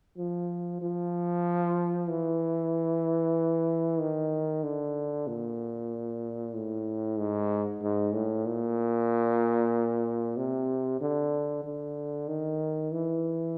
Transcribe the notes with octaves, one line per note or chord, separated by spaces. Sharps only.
F3
F3
E3
D#3
D3
A#2
A2
G#2
G#2
A2
A#2
C3
D3
D3
D#3
E3